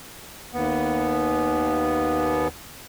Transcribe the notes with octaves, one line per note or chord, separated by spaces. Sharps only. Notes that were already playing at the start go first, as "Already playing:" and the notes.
D#2 B3